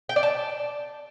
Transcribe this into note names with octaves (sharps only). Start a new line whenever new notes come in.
G5
D5
A5